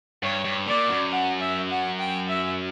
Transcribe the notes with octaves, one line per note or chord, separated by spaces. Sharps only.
G2 C#5
G2
A#2 D5
F#2
F#5
E5
F#5
G5
E5